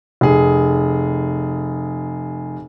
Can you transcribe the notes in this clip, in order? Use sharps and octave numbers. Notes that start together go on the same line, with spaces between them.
F1 G#4